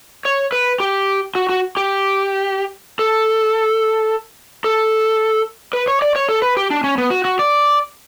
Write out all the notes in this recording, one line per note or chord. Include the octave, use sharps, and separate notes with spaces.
C#5
B4
G4
F#4
F#4
G4
A4
A4
B4
C#5
D5
C#5
A4
B4
G4
D4
C#4
B3
F#4
F#4
D5